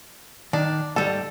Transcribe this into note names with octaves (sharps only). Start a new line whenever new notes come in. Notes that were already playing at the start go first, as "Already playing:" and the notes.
D#3 D4
D2 G#2 G3 A4